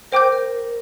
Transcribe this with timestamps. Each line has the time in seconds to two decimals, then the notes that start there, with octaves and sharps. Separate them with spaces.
0.12 A#4 C5 G5 D6 G6
0.32 A#4